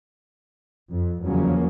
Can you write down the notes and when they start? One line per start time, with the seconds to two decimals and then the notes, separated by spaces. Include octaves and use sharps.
0.91 F2
1.24 E2 C#3 F3 F#3 A#3 C#4